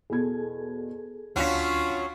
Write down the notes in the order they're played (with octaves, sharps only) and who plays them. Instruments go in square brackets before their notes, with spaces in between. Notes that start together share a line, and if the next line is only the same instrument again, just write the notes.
[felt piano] E2 B2 G#6 [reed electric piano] G#4 A4
[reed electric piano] D2 [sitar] F#3 C#4 [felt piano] D4 F5 B6 [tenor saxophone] F4